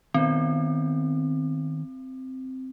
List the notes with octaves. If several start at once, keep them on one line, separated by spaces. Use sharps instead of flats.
D#3 B3 C4 C5